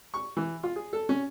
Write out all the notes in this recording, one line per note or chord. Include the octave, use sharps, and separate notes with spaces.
C#6
E3
F4
G#4
A4
C#4